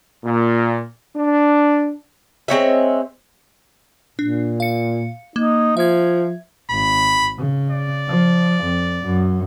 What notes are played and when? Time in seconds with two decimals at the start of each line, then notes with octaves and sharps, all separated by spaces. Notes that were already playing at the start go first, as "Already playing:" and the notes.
0.25 A#2
1.16 D4
2.48 G#3 C4 C#5 E5
4.19 A#2 D4
4.60 F5 C#7
5.36 A#3 D#4
5.77 F3 E5 G#6
6.71 G#1 B5
7.38 C#3
7.70 D5
8.08 F3
8.64 F2
9.05 F#2